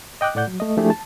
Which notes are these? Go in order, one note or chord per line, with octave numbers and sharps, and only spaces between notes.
D#5 G5 D6 F#6
A2 A3 D5 F#5 G6
F#3
A3 D#5
F3 A3 D4 E4 G4 G#4
A5